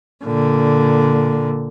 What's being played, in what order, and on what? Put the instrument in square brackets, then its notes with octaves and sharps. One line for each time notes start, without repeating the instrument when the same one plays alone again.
[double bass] A#2 D3